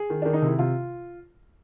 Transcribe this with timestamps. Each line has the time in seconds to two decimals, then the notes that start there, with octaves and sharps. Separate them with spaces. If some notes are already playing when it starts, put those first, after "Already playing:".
Already playing: G#4
0.10 D#3
0.22 D#3 D4
0.33 D#4
0.42 C3 E4
0.58 C3 F4